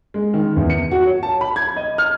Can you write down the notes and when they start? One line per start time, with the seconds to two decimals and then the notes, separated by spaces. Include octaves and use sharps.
0.14 G#3
0.34 D#3
0.57 E2
0.70 C#7
0.92 F#4
1.06 C#5
1.23 A5
1.41 B5
1.56 G#6
1.76 D#5
1.98 F6